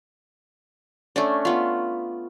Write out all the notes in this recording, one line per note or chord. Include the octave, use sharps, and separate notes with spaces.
A3 C#4 D4
B3 F4